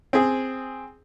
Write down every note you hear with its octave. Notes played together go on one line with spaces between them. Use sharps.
C4 G#4